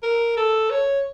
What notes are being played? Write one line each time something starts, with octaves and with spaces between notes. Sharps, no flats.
A#4
A4
C#5